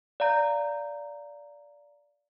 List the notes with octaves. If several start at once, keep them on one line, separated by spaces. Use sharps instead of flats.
D5 F5 A#5 G6